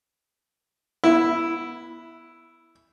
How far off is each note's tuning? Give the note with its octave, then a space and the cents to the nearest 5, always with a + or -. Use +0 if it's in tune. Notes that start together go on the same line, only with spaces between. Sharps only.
B3 -20 E4 +0